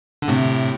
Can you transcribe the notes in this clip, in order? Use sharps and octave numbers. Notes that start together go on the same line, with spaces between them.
D3
A2 C3